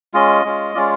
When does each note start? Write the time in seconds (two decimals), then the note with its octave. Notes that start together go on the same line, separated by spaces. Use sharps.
0.14 G#3 C#4 F4 D#5
0.45 G#3 C#4 F4
0.75 G#3 C#4 F4 D5